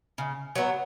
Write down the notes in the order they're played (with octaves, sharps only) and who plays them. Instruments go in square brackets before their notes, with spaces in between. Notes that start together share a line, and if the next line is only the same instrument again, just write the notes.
[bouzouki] C#3
F#3 B3